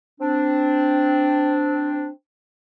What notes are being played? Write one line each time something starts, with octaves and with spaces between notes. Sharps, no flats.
C4 D4